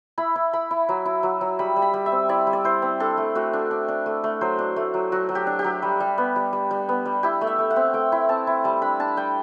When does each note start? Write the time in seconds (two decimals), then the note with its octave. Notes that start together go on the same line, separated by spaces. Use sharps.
0.18 E4 B5
0.36 E4
0.53 E4 B5
0.71 E4
0.89 F#3
1.05 E4
1.23 F#3
1.41 F#3
1.59 G3 B5
1.76 G3
1.82 B5
1.94 G3
2.06 E5
2.12 C4
2.29 E4 D5
2.47 G3
2.53 D5
2.64 E4 C5
2.82 C4
3.00 D4 A4
3.18 A3
3.35 A3 F#4
3.53 D4
3.71 D4
3.88 D4
4.06 A3
4.24 A3
4.41 F#3 C5
4.59 D4
4.76 A3
4.94 F#3
5.12 F#3 F#4
5.29 F#3
5.35 G4
5.47 D4
5.59 G4
5.64 F#3
5.82 G3
6.00 G3
6.18 B3
6.36 G3
6.53 G3
6.71 G3
6.89 B3
7.05 G3
7.23 E4 G4
7.41 A3
7.47 E5
7.59 A3
7.70 F#5
7.76 C4
7.93 A3 G5
8.12 E4
8.29 C4 A5
8.47 E4
8.64 G3 A5
8.82 D4 B5
9.00 D4 A5
9.17 G3 G5